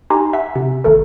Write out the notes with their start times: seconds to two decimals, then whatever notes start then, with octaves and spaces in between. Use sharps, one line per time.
0.10 D#4 G4 G#5 A#5 C6
0.33 E5 F#5 B6
0.56 C3
0.84 G#1 A3 A4 A#4